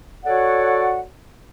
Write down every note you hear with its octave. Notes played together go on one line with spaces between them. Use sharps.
F#4 A4 C#5 D5 F#5